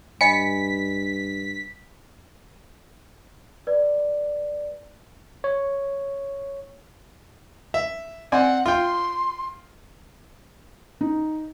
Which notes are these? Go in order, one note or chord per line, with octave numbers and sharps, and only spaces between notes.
G2 D#5 G#5 B5 B6 C#7
B4 D5
C#5
E5
C4 D5 F#5 G#5
F4 G5 C6
D#4